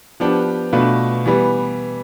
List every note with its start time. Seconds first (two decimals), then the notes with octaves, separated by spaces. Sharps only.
0.20 F3 B3 D4 G4
0.73 B2 A3 D4 F4 B4
1.26 E3 G3 B3